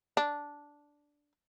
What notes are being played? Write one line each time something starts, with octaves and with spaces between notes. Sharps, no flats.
D4